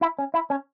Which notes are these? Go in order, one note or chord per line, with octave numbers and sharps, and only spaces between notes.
E4
C#4
E4
C#4